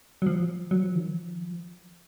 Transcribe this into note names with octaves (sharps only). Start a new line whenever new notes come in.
F#3
F3
F#3
F3
D#3
F3